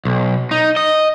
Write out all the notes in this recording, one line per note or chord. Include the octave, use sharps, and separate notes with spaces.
B1
D#4
D#5